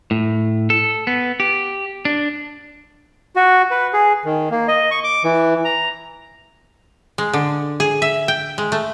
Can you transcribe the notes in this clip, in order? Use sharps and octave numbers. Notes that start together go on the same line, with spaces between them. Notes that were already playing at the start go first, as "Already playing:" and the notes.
A2
A4
B3
G4
D4
F#4
B4
G#4
D#3
A#3
D#5
C#6
D6
E3
A#5
G#3
D3
G#4
E5
G5
G#3
A3